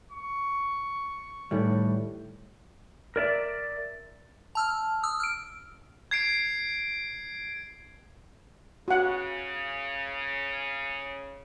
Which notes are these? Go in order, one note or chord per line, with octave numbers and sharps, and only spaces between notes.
C#6
A2 D#3 E3 G3
A#4 D5 E5
A5 E6 F6
D#6 E6
F6 D7
G#6 C7 D7
C#3 F#4 F#5